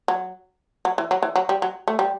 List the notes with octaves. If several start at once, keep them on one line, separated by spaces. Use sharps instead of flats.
F#3
F#3
E3
F#3
E3
F#3
G3
F#3
A3
G3